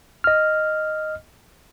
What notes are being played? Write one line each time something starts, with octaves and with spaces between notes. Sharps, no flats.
D#5 F6